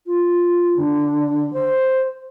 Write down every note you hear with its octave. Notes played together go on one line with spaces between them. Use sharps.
F4
D3
C5